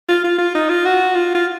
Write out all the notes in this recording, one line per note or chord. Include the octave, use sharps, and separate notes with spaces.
F4
F4
F4
D#4
F4
F#4
F4
F4